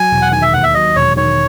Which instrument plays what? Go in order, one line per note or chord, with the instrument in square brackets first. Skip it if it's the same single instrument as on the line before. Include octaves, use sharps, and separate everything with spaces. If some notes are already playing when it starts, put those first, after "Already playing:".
Already playing: [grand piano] F#3 [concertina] G#5
[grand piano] E1
[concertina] F#5
[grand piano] D#3 [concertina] G#5
[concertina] E5
[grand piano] D#2 [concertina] F#5
[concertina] E5
[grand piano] F#3 [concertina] D#5
[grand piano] E1 [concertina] C#5
[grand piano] D#3 [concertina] C#5